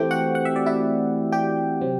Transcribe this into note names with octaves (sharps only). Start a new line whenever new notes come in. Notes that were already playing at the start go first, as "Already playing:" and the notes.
Already playing: E3 A3 C4 G4 G5
F#4 F#5
F#5
E5
D5
E4 E5
G4 G5
C3 F#3 C4